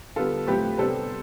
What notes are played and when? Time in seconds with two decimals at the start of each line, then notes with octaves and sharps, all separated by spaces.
0.16 D3 G3 B3 F4 A4
0.47 A2 F3 A3 C4 G4 B4
0.78 C3 G3 B3 D4 A4 C5